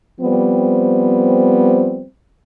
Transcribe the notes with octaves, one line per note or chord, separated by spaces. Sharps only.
F3 G3 B3 C4